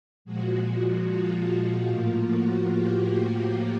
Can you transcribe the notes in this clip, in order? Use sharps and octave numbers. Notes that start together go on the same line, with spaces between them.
A#2 F3 G#3 F#4
F#4
F4
A2 F3 A#3
F#4
G4
G4